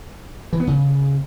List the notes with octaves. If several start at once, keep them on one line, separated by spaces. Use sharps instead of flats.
E3
B3
C#3